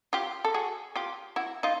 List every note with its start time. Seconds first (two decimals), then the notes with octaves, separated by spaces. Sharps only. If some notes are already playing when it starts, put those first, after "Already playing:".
0.13 F4 G4
0.45 A4
0.54 F#4 G#4
0.96 F4 G4
1.36 E4 F#4
1.63 D#4 F4